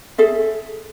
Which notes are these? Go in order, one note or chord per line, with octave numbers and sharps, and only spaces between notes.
G#4 A4 E5